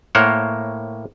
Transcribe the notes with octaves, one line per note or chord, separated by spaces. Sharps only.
A2 A#3 A#4 C5 C#5 F#5